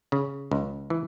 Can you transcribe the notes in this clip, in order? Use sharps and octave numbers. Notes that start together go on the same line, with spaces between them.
C#3
C#2
E3